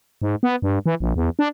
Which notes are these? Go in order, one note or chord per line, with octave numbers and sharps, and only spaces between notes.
G#2
B3
G2
E3
A#1
E2
D4